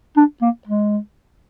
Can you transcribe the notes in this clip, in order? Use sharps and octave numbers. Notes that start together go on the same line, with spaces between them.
D4
A#3
G#3